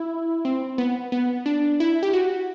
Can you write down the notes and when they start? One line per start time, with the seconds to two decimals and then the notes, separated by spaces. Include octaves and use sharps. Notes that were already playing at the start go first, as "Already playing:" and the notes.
Already playing: E4
0.45 C4
0.78 B3
1.12 B3
1.46 D4
1.80 E4
2.03 G4
2.13 F#4